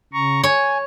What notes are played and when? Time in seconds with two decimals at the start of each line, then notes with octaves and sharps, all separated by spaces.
0.13 C#3 A#5 C#6
0.44 C#5 G#5